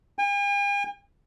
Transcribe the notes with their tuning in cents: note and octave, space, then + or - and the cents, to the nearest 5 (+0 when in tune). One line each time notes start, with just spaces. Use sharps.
G#5 -45